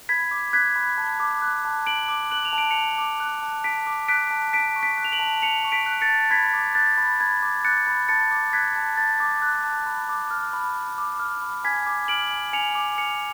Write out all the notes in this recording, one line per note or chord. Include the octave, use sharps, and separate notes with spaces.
B5 G#6 B6
D6
F#6 G#6 B6
B5
A5
D6
F#6
A5
A5 D7 F#7
D6
F#6 F#7
F7
A5
D7
C#7 F7
A5
D6
F#6
A5
A5 B6 D7
D6
F#6 B6 D7
A5
A5 B6 D7
C#6
B6 D7
F#6
F7
D7 F#7
A5
A5 C#7 F7
C#6
B6 D7
F#6
A6 C#7
A5
B5 G#6 B6
D6
F#6 A6
B5
B5 G#6
D6
F#6 A6 C#7
B5
A5 A6 C#7
D6
F#6 G#6 B6
A5
A5 A6
D6
F#6
A5
B5
D6
F6
B5
B5
D6
F6
B5
G#5 G#6 B6
D6
F6 D7 F#7
G#5
G#5 C#7 F7
D6
F6 C#7 F7